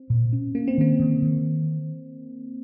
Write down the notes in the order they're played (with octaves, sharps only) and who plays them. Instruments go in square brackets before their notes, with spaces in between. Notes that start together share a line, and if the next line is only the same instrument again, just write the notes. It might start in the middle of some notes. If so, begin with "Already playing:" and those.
Already playing: [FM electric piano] C4
[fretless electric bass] A#2
C#4
[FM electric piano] A#3 [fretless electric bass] C#4
[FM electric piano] C4
[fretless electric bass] D#3 [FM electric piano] A#3
[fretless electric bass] D#3
D#3